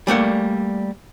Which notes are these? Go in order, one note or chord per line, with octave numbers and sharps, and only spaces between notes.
G3 A3 A#3 F#5